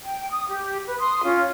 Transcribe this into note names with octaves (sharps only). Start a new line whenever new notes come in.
G5
D#6
G4
B4
C6 D#6
C#4 F4